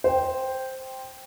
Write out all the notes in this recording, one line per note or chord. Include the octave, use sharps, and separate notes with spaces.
C5 G5